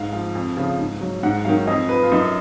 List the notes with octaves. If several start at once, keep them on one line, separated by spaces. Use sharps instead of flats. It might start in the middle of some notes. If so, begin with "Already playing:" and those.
Already playing: G#2 F5
F3 F5
F2
C#3 F3
G#2
F#3
G#2 F#5
F#5
D#3 F#3 F5
F2 D#5
F3 B4
F4
F#2 D#4